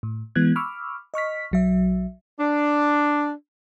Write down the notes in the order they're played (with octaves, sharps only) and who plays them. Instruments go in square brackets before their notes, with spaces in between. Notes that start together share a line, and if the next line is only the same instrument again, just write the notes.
[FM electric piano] A2
E3 G#3 B3 F#6 G#6
B5 C#6 D6 E6 F6
D#5 C#6 F6 B6
B1 F#3 E5
[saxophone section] D4